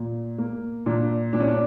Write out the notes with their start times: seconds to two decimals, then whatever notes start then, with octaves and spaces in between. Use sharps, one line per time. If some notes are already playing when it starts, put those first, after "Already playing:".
Already playing: A#2
0.38 A#3
0.86 A#2 D4
1.33 A#2 D4
1.40 C#4
1.48 D4